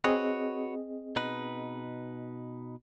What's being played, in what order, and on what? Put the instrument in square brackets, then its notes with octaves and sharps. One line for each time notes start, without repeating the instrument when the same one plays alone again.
[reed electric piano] C4 G#4 D#5 [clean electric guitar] F#4 B4 C#5
[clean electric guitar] B2 D#4 B4